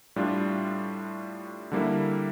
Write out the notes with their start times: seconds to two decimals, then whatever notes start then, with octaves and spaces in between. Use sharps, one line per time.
0.16 A2 G3 D4 F4
1.72 D3 G3 A#3 E4